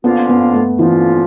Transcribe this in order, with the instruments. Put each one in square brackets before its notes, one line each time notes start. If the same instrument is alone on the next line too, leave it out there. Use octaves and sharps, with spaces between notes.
[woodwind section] D3 F3 A#3 C#4 F4 [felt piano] B3
[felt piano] B3
A3
[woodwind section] D3 F3 A#3 C#4 F4 [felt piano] E3